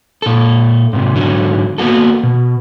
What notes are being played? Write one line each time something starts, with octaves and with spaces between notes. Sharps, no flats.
A#2 A4
G#2 C3
G#2 D3 F#3
A#3 B3 F#4 A4
B2